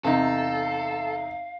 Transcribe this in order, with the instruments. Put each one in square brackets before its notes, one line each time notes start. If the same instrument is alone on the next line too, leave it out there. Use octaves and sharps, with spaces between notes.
[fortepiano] E2 C3 D#4 [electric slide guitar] A4 [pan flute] F5